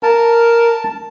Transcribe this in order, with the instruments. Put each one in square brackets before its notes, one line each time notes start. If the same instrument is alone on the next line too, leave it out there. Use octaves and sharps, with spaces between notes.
[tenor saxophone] A#4 [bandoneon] A5